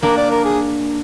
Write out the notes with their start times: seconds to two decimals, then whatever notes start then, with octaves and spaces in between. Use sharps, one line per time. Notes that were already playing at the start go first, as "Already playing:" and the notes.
0.03 A#3 D4 A#4
0.17 D5
0.31 A#4
0.45 G#4